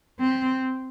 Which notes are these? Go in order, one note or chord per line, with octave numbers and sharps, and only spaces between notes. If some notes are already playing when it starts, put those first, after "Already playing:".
C4